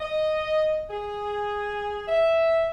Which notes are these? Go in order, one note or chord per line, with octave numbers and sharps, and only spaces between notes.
D#5
G#4
E5